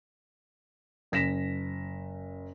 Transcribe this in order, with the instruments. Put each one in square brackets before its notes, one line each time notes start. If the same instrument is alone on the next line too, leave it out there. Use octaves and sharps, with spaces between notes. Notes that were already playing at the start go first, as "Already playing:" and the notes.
[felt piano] F#1 A#6 B6 E7